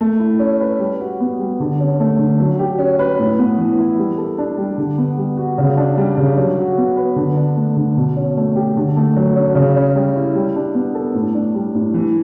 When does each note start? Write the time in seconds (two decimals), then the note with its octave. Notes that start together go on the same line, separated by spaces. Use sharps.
0.01 A3
0.20 E4
0.39 C#4
0.60 B4
0.79 G3
1.00 F#4
1.20 B3
1.39 G3
1.60 D3
1.80 C#4
2.00 A3
2.19 D3
2.40 F#3
2.59 G4
2.79 C#4
2.99 B4
3.19 A2
3.39 B3
3.58 E3
3.78 E4
3.98 G3
4.18 A4
4.38 D4
4.58 G3
4.78 D3
4.98 B3
5.18 G3
5.37 F#4
5.58 C#3
5.77 D4
5.97 G3
6.17 C#3
6.37 F#3
6.58 F#4
6.78 B3
6.96 B4
7.16 D3
7.36 D4
7.57 A3
7.76 D3
7.97 B2
8.16 C#4
8.37 A3
8.55 G4
8.77 D3
8.96 A3
9.16 F#3
9.36 C#4
9.55 C#3
9.76 C#4
9.95 G3
10.16 E4
10.35 G3
10.56 D4
10.74 B3
10.95 A4
11.15 A2
11.34 D4
11.54 G3
11.75 A2
11.94 E3